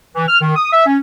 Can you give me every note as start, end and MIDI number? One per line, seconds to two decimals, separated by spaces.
0.15 0.27 52
0.28 0.37 89
0.41 0.53 51
0.56 0.70 87
0.73 0.87 76
0.87 0.98 61